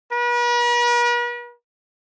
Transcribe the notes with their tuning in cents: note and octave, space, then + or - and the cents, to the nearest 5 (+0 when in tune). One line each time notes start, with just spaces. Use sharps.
B4 -45